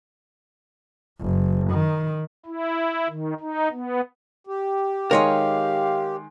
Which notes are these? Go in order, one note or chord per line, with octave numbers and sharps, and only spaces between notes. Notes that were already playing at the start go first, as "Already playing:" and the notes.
F#1
D#3
E4
D#3
D#4
B3
G4
D#3 G#3 A#4 C#5 D#5 F5 C6